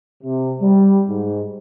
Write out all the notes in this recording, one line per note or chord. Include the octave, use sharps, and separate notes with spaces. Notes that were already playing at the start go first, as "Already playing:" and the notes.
C3
G3
G#2